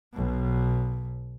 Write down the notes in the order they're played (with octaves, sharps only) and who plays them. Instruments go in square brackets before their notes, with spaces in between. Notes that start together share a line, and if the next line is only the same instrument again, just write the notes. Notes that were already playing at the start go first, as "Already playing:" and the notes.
[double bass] B1 B2